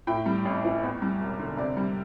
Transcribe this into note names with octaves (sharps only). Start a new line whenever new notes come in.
A2 G5
G3
A1
E3
E2
G3
E1
D3
C3 D5
G3